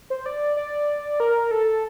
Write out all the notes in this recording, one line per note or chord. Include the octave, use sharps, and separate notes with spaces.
C5
D5
D5
A#4
A4